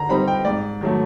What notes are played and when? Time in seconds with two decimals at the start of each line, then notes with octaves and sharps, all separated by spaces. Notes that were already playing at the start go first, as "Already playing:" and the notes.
Already playing: D3 A#5
0.09 G3 C4 D#4 B5
0.28 G5
0.45 G#2 D5
0.81 D#3 F#3 A3